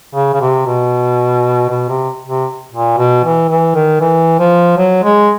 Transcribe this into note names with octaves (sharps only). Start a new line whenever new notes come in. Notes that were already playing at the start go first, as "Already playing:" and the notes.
C#3
C#3
C3
B2
B2
C3
C3
A#2
B2
E3
E3
D#3
E3
F3
F#3
G#3